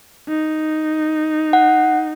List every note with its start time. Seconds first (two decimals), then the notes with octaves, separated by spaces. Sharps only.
0.28 D#4
1.53 F#5